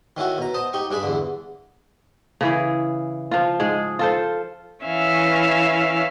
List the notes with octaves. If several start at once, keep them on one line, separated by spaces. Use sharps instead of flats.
D#3 C#4 E4 F#4
B2 A#5
C5 D#5 A5
D#4 G4 C#6
G2 D4 G#4 D5 B5
E2 D3
C#3 E3 G#4
F3 F4
G#2 G#3 G#4
F4 A4 C5
E3 C#4 E5 F5